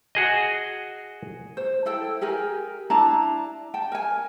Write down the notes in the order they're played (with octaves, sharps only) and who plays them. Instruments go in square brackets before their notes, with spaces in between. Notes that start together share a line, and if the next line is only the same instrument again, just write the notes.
[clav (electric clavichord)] F#4 G#4 D#5
[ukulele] C5
E4 A4 G5
G4 G#4 A#4 G#5
D4 E4 A5 A#5
G5 A5
A#4 G#5